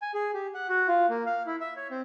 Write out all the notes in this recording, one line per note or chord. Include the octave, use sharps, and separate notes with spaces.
G#5
G#4
G4
F#5
F#4
F4
A#3
F5
E4
E5
C#5
C4